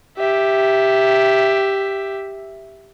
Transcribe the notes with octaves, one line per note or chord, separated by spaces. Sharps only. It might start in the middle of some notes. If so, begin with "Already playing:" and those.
G4 E5